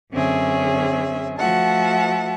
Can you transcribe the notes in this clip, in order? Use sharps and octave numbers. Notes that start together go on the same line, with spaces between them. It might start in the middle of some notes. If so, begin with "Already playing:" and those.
F#2 D3 C4 C#4 G#4 E5
F3 A3 F#4 E5 F#5 A5